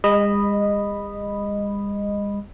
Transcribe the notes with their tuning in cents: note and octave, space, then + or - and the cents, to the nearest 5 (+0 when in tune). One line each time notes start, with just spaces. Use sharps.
G#3 -45 D#5 -10 B5 +0